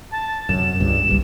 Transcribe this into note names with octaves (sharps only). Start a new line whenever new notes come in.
A5
F#2 C3 E7
C#2 G2
F#1 C2 G2